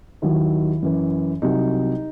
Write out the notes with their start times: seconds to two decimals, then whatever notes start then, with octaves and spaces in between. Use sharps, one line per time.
0.22 D#2 D#3 F#3 E4
0.82 F#2 E3
1.42 C2 C3 F#3 D#4